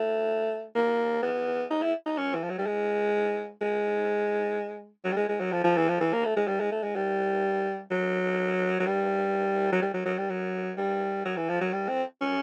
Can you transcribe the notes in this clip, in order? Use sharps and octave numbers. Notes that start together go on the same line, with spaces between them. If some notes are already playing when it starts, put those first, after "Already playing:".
Already playing: A3
A#3
B3
D#4
E4
D#4
C#4
E3
F3
F#3
G3
G#3
G#3
F#3
G3
G#3
G#3
F#3
F3
F3
E3
F3
E3
A#3
A3
G#3
G3
G#3
A3
G#3
G3
F#3
F#3
G3
F#3
G3
F#3
F#3
G3
F#3
G3
F#3
E3
F3
F#3
G3
C4
C#4